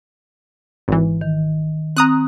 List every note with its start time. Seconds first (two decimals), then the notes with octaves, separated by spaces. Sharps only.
0.88 G#1 E3
1.21 D#3
1.97 C4 A#5 D#6 F#6